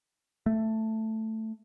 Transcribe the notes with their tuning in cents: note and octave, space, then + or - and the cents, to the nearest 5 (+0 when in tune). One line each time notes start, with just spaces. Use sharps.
A3 +5